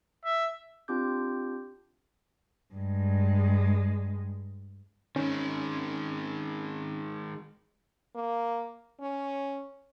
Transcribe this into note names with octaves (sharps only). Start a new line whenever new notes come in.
E5
C4 D4 F4 G4 D6 G6
G2 G#3
D#3 G#3 C#4
A#3
C#4